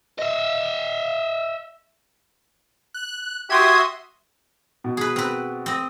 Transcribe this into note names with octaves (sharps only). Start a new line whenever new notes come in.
D#5 E5
F#6
F#4 G4 E5 C6 D#6 G#6
B2
G#4 B4
C4 B4
C4 D#5